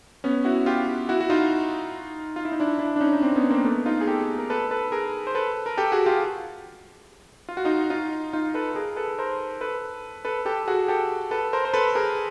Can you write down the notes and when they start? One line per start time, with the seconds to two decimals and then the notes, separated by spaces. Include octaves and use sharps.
0.24 B3 C#4
0.45 E4 F#4
0.66 F4 G4
1.09 E4 F#4
1.21 F#4
1.30 D#4 F4
2.36 F4
2.45 E4
2.52 D#4
2.60 D4 E4
2.79 D4 E4
2.96 D4
3.01 C#4 D#4
3.13 D#4
3.22 C4 D4
3.36 B3 C#4
3.50 A#3 C4
3.64 A3 B3
3.86 D#4 F4
4.01 G#4
4.07 G4 A4
4.38 A#4
4.50 A4 B4
4.71 A4 B4
4.92 G#4 A#4
5.27 C5
5.35 A4 B4
5.66 A#4
5.77 G4 A4
5.92 F#4 G#4
6.06 F4 G4
7.49 F4
7.57 F#4
7.65 D#4 F4
7.90 D#4 F4
8.33 D#4 F4
8.54 A4 B4
8.75 G#4 A#4
8.96 A4 B4
9.19 A#4 C5
9.61 A4 B4
10.25 A4 B4
10.46 G4 A4
10.67 F#4 G#4
10.88 G4 A4
11.31 A4 B4
11.53 A#4 C5
11.65 C5
11.74 A4 B4
11.95 G#4 A#4